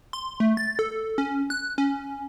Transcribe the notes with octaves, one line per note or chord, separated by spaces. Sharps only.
C6
A3
A6
A4
C#4
F#6
C#4